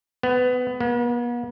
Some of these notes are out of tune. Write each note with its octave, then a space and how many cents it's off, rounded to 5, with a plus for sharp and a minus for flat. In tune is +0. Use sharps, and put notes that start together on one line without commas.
B3 +20
B3 -45